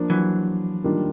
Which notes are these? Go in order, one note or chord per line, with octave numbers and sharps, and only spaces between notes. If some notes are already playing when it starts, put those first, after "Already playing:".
Already playing: F3 A#3 D4
E3 F#3
D#3 G3 A#3 D4 F4